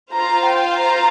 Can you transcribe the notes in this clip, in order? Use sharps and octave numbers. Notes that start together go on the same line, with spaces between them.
F4 C5 F5 A#5
G5
A#5